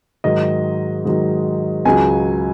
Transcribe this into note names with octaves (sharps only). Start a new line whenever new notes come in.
G#2 D#3 F#3 D#5
G#2 D#3 F#3
C#2 C#3 F#3 G#5